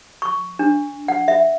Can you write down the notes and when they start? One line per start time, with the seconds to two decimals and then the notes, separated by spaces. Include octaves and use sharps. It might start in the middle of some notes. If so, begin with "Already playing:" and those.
0.22 C#6
0.59 D4
1.08 F#5
1.28 E5